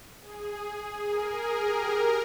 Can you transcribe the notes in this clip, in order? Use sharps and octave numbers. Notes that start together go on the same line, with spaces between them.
G#4
G#4
A#4
G#4
G4
A#4